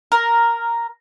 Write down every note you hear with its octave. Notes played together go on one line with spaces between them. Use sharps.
A#4